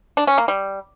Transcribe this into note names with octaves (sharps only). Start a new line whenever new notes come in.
D4
C#4
A#3
G3